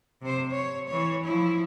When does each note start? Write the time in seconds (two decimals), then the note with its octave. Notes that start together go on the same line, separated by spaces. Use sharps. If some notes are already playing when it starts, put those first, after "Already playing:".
0.22 C3 C5
0.51 C#5
0.88 E3 C#5
1.24 F3 E4